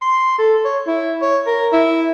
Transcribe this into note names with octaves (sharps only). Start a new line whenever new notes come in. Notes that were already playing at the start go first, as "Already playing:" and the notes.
C6
A4
C#5
E4
C#5
A#4
E4